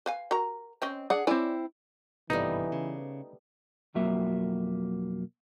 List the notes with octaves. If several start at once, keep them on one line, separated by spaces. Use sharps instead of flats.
B4 F5 G#5
F#4 A#4 A#5
C4 C#4 D#5
D4 G#4 F#5
C4 E4 C#5 D5 G#5
G#1 G2 C3 E3 G3 A3 B3 D#4
C#3
B1 F2 F#3 A#3 E5